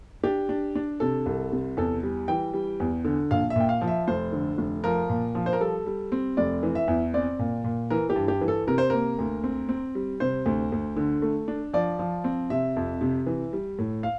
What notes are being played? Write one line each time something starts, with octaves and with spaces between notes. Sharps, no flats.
D4 G4
D4
D4
C3 A4
C2
C3
E2 A4
G3
E3 G5
G3
E2
D3
A#1 F5
E5
A#2 G5
F5
F3
E5
F1 C5
D3
F1
F3 A#4
A#2
F3
C5
A#4
G3 A4
G3
C4
F1 D5
E3
E5
E2
C4 D5
A#2
A#2
E3 A#4
G4
G2
G4
E3
A4
C3 A#4
C5
A#3 A#4
D2
C4
C4
G3
C3 C5
D2
D2
D3
A3
D4
F3 D5
F3
C4
C3 E5
F2
C3
E3
G3
A2
F5